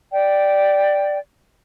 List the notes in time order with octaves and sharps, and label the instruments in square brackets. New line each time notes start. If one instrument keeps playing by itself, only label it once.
[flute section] D5 G5